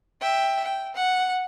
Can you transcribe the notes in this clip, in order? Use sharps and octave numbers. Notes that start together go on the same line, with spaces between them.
E5 G5
G5
F#5